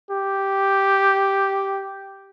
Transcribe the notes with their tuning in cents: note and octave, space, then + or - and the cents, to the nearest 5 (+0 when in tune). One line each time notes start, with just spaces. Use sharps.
G4 -5